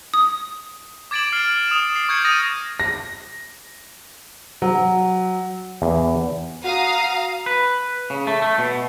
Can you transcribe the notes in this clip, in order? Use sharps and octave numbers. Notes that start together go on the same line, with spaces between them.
D#6
D6 G#6 A6 D7 E7 F#7
F6 C7
D#6 E7
C7 F#7
C#6 G6 G#6 C7 C#7
D#6 A6 A#6 D#7
A#6
F#3
E2
F#4 F5 A#5 D#6
B4
C#3
A3
A3
B2